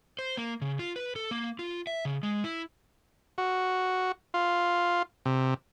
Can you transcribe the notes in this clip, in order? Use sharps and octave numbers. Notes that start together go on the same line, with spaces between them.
C5
A#3
C#3
F4
B4
A4
A#3
F4
E5
C#3
G#3
E4
F#4
F4
C3